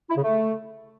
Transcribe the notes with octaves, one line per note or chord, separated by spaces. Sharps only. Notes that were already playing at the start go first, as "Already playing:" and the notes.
E4
C#3
A3